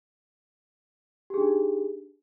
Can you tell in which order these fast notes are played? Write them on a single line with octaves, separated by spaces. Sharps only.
G4 G#4 D4 D#4